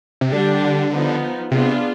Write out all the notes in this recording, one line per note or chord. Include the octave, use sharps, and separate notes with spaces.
C3
D3 G3 D4 G4
F3 B3 D#4
C3 B3 D4 F4 G#4